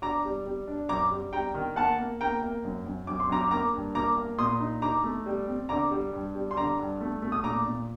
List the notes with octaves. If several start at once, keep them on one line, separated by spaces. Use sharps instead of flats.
D4 A#5 D6
G3
G3
D4
F#2 A#5 D6
G3
G3 G5 A#5
D#3
A#3 F#5 A5
A#3
A#3 G5 A#5
A#3
F#2
F#2
F#2 D6
C6
F#2 A#5 D6
A#3 A#5 D6
G2
A#3 A#5 D6
A#3
A#2 C6 D#6
D#4
D#4 A#5 D6
A3
G3
C4
D3 A#5 D6
G3
G2
G3
C6
D3 A#5 D6
G2
A3
A3
D#6
A#2 A#5 D6
A#2